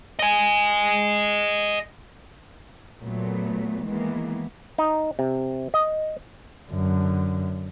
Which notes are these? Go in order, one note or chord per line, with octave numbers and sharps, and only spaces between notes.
D#5 G#5
A#2 F#3 A3 B3
D#3 E3 G#3 A#3 B3
D#4
C3
D#5
F#2 D3